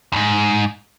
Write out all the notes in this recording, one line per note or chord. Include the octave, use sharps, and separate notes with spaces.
E2 G#2